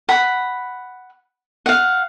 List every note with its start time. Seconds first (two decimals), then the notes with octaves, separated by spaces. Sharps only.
0.09 F#5 B5
1.66 F5 F#5